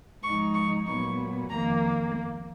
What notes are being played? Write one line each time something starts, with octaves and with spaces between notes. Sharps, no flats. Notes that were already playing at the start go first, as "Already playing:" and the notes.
G#2 F3 G#3 D#4 C#6
C#6
A#2 F#3 B3 C#6
F2 D#3 A#3 A#5